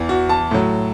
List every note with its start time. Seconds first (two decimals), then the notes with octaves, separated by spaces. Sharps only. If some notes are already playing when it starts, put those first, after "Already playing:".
Already playing: E2 E3
0.09 F#4
0.29 A5
0.51 A2 F#3